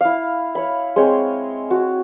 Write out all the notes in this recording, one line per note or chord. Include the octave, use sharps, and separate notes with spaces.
E4 F5
C#5 B5
G#3 C4 G#4 C#5
F#4 A5